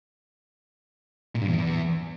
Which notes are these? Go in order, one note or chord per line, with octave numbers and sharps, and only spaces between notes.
A#2
G2
E2